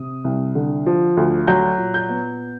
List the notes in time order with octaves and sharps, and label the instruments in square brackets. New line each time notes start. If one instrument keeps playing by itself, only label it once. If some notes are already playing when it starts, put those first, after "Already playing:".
Already playing: [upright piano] C3 D#6
C2
D3
F3
D2
F#3 G6
A#2
G6
B3